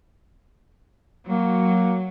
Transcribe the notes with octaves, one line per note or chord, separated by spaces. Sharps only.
F#3 A#3